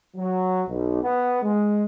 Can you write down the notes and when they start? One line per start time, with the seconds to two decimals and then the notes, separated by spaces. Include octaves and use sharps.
0.17 F#3
0.67 B1
1.02 B3
1.42 G#3